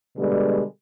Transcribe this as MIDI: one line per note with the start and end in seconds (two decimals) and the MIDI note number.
0.18 0.62 47
0.18 0.62 50
0.18 0.62 55
0.18 0.62 56